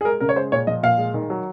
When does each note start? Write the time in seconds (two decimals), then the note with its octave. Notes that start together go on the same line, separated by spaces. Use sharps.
0.01 G#4
0.05 G#3 A#4
0.20 C#3 A#4
0.29 C#5
0.36 G#3 C5
0.52 A#2 C#5
0.67 F3 D#5
0.83 A#2 F5
0.98 G#3
1.14 D#3
1.30 F#3